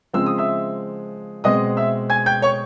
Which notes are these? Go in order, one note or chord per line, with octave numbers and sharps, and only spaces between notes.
C#3 F3 G#3 C4 E6
D#6
E5 E6
B2 G#3 C4 D#5 D#6
E5 E6
G#5 G#6
G5 G6
C#5 C#6